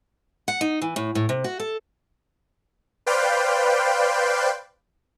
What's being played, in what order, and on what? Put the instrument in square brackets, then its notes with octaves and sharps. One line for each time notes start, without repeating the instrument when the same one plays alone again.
[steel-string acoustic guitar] F#5
D#4
E3
A2
A2
C3
F#4
A4
[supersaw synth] B4 C5 D5 F5 G5